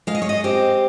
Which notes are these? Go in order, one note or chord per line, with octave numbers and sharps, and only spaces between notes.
G#3 F5
D#5
C#5
D#5
C4 G4